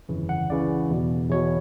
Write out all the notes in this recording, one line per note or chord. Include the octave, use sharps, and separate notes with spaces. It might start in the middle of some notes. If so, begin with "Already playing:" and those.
G1 F2 C#3 E3
F#5
C#2 C#3 E3 D5
E2 B2
E2 B2 C#5